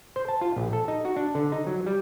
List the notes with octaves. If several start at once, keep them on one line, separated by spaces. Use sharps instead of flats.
C5
A5
F4
A#1
A4
D#4
F#4
D4
D3
D#4
F#3
G3